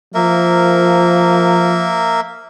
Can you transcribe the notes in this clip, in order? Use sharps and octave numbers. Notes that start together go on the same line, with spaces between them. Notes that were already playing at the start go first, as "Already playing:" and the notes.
F3 A#3 A#4 E5